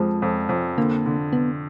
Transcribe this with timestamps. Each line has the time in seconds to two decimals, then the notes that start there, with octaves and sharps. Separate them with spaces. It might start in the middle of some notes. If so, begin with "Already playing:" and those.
Already playing: F2 F3 G#3
0.22 F2
0.49 F2
0.77 D3 A#3
1.06 D3
1.33 D3 B3